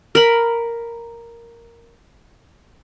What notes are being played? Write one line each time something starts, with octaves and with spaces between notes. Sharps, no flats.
A#4 B5